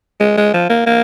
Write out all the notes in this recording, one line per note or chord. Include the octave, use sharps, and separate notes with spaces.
G#3
G#3
F3
A#3
A#3